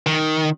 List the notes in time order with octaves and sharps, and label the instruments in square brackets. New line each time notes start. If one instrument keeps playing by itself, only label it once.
[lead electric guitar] D#3